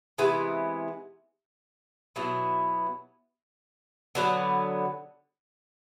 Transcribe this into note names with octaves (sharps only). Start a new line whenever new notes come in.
C3 E3 G#3 B3
B2 F#3 B3 E4
D3 F#3 B3